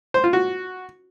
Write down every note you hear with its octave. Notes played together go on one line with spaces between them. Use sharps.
C5
F4
F#4